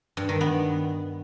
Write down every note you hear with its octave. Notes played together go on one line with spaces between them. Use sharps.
G2
D#3
B3